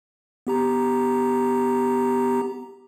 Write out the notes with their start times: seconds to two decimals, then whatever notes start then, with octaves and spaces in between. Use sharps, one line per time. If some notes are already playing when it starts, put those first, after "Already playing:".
0.47 B3 G4 A#5